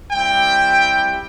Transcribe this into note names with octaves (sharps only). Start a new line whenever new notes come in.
G3 C4 E4 G4 G5